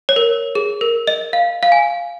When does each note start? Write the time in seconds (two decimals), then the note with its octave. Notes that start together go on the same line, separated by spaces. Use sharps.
0.09 C#5
0.16 A#4
0.55 G#4
0.81 A#4
1.07 D#5
1.33 F5
1.63 F5
1.72 G#5